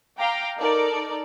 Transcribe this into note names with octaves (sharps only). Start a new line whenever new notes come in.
F5 G5 A#5 D6
D#4 A4 A#4 D5